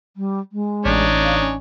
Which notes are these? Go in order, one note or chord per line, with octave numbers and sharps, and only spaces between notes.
G3
G#3
A1 D4 D#4 C#5
F5
C#4